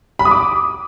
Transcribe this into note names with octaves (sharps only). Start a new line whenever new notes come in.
B5
D#6
D6